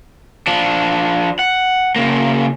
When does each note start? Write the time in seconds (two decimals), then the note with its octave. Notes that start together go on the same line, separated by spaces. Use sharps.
0.47 F3 D4
1.39 F#5
1.96 C#3 A#3